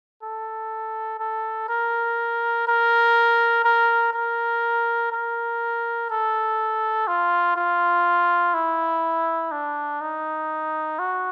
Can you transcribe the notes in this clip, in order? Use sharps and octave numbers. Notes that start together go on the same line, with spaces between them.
A4
A4
A#4
A#4
A#4
A#4
A#4
A4
F4
F4
E4
D4
D#4
F#4